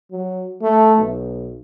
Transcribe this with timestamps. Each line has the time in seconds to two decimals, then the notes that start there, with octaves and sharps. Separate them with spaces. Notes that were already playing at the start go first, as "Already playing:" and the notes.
0.12 F#3
0.62 A3
0.99 B1